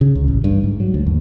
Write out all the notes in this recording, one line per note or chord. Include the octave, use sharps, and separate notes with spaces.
C#3
C#2
A1
G2
G#2
F#3
D2
D#2